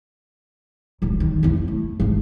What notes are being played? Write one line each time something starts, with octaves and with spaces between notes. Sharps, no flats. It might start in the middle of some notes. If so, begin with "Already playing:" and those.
D1 A#1
D#3
F2 E4
A3
G#1 D2